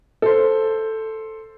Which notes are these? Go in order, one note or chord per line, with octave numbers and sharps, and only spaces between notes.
A4 C5